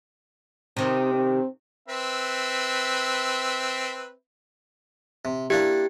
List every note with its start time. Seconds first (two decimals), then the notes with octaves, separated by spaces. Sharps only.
0.77 C3 D#3 C4
1.14 C4
1.89 C4 B4 E5
5.25 C3
5.50 A#3 D4 E4 G4